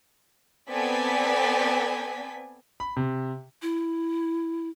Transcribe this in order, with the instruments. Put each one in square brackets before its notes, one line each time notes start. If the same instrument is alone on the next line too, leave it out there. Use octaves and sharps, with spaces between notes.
[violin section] B3 C4 A4 D5 G#5 B6
[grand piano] B5
C3
[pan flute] E4